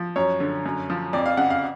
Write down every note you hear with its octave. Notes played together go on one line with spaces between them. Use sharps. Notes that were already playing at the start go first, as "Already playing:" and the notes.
Already playing: F3
F#2 C#5
D3
F#2
F3
F2 D5
F5
C#3 F#5
F5